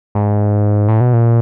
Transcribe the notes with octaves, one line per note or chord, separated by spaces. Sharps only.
G#2
A2
B2
A#2